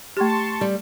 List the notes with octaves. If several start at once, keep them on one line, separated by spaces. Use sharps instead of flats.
A3 G4 A5 C6 C#6
G3